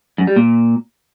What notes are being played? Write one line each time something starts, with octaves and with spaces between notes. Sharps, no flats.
F#2
G3
A#2